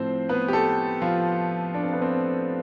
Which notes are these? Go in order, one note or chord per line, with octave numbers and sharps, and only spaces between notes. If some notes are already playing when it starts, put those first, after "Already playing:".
Already playing: A2 F3 C4 C5
B3 B4
G4
A3 A4
F3 F4
D4
C4
B3
C4